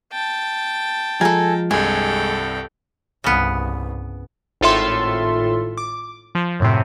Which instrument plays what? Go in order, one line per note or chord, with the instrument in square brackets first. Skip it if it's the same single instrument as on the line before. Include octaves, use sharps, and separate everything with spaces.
[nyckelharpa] G5 A5
[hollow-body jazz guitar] F3 G#3 [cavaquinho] A4 G#5 [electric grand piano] A#5
[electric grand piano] C2 G2 [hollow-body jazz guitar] G#3 [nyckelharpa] A4 G5 [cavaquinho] G#5
[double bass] C2 G2 [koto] C#3 B3
[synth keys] G#1 A2 F4 A4 E5 C6
D6
F3
F#2 A2 C3